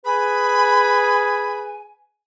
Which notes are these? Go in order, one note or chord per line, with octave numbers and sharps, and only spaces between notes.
G#4 B4 G#5 B5